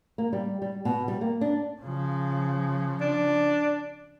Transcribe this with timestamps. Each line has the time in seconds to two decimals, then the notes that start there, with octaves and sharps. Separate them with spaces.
0.18 A#3
0.33 G3
0.62 G3
0.85 B2
1.08 G3
1.21 A#3
1.41 D4
1.82 C#3 F3
3.01 D4